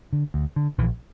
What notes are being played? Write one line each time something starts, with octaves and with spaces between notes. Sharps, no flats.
D3
D2
D3
A#1 E3